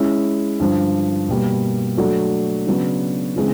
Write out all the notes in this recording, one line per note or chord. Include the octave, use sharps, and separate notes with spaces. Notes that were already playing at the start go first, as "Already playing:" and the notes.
Already playing: G#3 C#4 E4
G2 D3 F3
B2 G3 A#3
F#3 A3 D4 F#4 A4
C#3 F#3 B3 D4
C#3 E3 G#3 C4